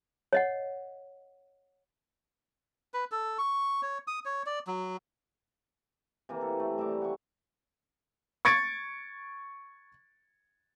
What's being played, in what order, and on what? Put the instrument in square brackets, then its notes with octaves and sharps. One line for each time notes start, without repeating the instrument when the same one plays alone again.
[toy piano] C#5 D#5 F#5
[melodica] B4
A4
C#6
C#5
D#6
C#5
D5
F#3
[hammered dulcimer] C3 E3 A#3
A4
A3
G3 E5 A#5 D6
F#5 C#6
[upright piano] C#6 G#6 A6 C#7 D7